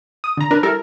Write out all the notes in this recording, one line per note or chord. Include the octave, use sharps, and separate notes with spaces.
D#6
D3 A#5
D4 A#4 B4
G3 E4 A4 A#4